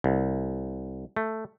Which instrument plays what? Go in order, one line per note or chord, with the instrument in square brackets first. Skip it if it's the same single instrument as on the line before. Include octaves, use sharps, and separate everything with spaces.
[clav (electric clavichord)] C2
A3